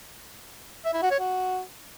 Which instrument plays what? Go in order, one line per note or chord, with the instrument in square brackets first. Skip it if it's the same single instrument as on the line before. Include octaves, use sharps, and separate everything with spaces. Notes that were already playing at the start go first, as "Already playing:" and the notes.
[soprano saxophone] E5
E4
F#4
C#5
F#4